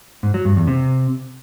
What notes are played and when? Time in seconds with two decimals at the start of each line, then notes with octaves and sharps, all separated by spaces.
0.23 G#2
0.34 F#3
0.45 G2
0.56 E2
0.67 C3